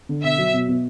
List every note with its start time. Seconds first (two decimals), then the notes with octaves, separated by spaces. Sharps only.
0.09 D3
0.23 B2 E5
0.38 F#3
0.54 B2
0.69 B2